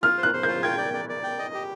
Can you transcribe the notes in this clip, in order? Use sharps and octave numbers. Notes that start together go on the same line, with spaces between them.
F4 F6
C5
F#6
C5
F4 G6
G5 G#6
D5
D5
D5
G5
D#5
G4